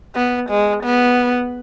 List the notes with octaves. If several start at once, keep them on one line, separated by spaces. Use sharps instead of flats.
B3
G#3
B3